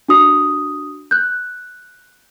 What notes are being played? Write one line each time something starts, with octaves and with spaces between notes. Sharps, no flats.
D4 F#4 D#6
F#6 G6